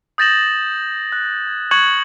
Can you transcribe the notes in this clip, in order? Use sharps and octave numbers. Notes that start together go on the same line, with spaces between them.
D#6 G6 A6 A#6 E7 F#7
F#6
G#6
C#6 F#6 G#6 C#7 F#7